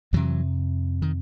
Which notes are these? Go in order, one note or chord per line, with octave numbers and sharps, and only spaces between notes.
F2 C3 E3 F#3
D#3